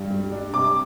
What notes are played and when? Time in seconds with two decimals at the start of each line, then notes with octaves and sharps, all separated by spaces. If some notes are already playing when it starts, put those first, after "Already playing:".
Already playing: G2 G3
0.10 G3
0.32 D4
0.53 C3 D6